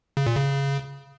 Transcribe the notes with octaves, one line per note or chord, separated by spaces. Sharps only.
C#3
A#2
C#3